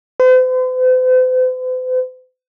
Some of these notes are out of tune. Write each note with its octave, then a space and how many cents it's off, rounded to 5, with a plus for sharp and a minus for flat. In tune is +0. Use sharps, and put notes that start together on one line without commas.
C5 -45